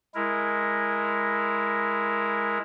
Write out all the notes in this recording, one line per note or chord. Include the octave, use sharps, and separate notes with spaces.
G#3 E4 A#4